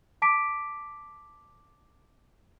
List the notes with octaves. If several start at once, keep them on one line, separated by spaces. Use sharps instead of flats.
A5 D6 B6 D7